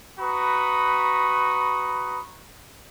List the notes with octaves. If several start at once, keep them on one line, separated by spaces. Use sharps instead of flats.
F#4 B4 A#5 B5 C#6 D#6